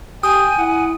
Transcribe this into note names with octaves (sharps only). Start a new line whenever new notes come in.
G4 G5 G#5 D#6
E4 F#5